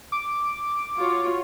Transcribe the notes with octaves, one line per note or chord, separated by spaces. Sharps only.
D6
F4 F#4 C#5